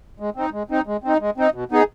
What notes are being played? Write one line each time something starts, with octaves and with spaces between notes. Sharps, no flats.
G#3
C4 D#4
G#3
C4 D#4
G#3
C4 D#4
G#3
C4 D#4
B2
B3 D#4 G#4